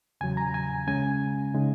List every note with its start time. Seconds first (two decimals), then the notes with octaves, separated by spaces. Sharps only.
0.21 E2 C#3 F#3 G#5
0.37 A#5
0.54 G#5
0.88 C#2 C#3 G#3 C#4 G#5
1.54 C#3 G#3 D#4